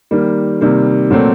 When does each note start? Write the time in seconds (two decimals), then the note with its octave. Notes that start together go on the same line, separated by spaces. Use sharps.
0.11 D#3 G3 A#3
0.61 C3 D#3 G3 A#3
1.10 A#2 F#3 A3 C4